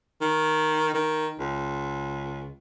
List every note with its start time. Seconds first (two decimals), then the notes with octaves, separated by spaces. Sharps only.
0.21 D#3
0.94 D#3
1.40 C#2